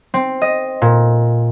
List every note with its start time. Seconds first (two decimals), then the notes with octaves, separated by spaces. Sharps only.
0.14 C4
0.42 D#5
0.82 A#2